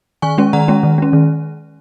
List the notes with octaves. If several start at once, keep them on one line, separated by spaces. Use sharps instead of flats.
D#3 G#5 C#6
G#3 C#4
D#3 F#5 A#5
G#3 C#4
D#3
G#3 C#4
D#3